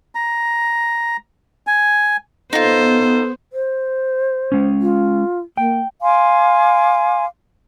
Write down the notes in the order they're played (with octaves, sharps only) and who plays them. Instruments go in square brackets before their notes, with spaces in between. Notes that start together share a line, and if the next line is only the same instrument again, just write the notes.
[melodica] A#5
G#5
[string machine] B3 [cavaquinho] D#4 F4 [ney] A4 [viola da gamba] C5
[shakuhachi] C5
[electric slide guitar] G#3 C#4
[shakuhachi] F4
[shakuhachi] A#3 [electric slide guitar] G5
[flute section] F5 G#5 C6 D6